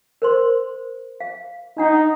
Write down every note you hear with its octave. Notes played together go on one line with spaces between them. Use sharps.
A#4 C5 C6
F5
D4 D#4 F#5